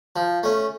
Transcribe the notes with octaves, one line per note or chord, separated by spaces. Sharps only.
F3
A3 C#4